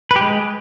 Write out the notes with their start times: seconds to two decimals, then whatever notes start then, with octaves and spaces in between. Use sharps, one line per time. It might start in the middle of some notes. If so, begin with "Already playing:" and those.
0.11 B4
0.16 G4
0.21 G#3